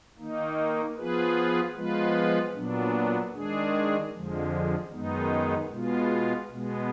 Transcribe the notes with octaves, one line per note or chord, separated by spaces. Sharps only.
D#3 A#3 D#4
F3 B3 F4 G#4 B4
F3 G#3 B3 F4 B4
A#2 F#3 B3 D4
D#3 G#3 D4 G#4
F2 D3 F3 G#3
F#2 D#3 G#3 B3 D#4
B2 G#3 B3 F4
B2 G#3 B3